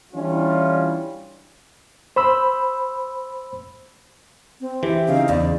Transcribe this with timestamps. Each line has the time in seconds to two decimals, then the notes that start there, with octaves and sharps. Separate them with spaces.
0.14 E3 G3 C#4 D4 E4 F4
2.16 C5 B5 E6
4.61 C4
4.83 E3 G4 E5
5.08 C#3 C4 D#4 F5
5.29 E2 D5